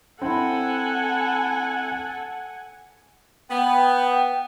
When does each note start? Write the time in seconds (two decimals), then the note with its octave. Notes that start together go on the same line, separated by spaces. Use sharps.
0.22 C4 E4 A4 F#5 G#5
3.50 B3 G5